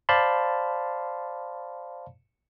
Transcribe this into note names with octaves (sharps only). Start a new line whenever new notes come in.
C5 D5 F5 A5 B5 C6